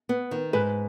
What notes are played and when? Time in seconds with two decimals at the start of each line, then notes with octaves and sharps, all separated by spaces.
0.09 B3
0.31 D#3
0.53 G#2 B4